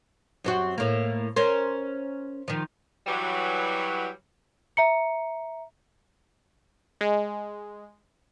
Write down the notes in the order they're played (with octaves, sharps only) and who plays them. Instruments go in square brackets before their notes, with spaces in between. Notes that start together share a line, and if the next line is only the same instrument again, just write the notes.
[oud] F#2 C4 F#4
A2 A#3
C#4 A#4 C5
D#3 F3
[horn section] E3 F#3 G3
[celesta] E5 A#5 C#7
[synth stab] G#3